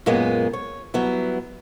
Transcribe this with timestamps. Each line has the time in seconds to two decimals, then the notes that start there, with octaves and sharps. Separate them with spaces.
0.06 F#2 A#2 G#3 A#3 B3
0.53 C#5
0.94 F#3 G3 B3 E4